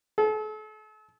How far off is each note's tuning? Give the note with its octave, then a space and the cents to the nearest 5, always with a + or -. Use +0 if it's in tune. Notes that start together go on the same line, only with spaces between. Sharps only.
A4 -40